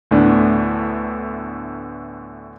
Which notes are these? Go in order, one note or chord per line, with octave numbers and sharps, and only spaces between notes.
D2 A2 D3 A3 B3 D4